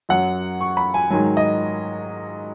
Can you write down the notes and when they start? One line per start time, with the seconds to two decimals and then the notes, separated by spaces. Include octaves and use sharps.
0.09 F#2 F#3 F#5
0.61 C#6
0.77 B5
0.94 G#5
1.10 G#2 D#3 F#3 G#5
1.37 D#5